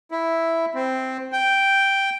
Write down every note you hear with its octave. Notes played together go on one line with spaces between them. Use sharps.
E4
C4
G5